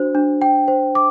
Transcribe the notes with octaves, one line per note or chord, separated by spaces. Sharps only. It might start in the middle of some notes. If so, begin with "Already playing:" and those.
Already playing: D4 F#4 C5
D4
G5
C5
D6